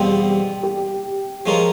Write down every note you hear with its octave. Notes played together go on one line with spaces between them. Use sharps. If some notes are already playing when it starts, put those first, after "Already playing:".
Already playing: E2 B2 G3 C4 F4 G4
G4
F3 G#3 C#4 F4 A#4